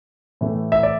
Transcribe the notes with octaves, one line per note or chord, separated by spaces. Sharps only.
A2 E3 A3
E5
D5